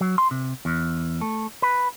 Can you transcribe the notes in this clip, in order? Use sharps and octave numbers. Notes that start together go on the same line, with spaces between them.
F#3
C6
C3
E2
A3
B4